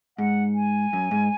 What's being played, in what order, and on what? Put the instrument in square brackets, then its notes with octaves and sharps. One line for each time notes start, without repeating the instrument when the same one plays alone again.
[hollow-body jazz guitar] G#2 [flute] F#5
[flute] G#5
[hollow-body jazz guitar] F#2
G#2